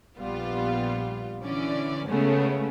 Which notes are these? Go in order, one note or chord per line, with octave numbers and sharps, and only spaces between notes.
A#1 G3 B3 F4
D3 E3 C#4 D5
C#3 G#3 A3 B3 C#4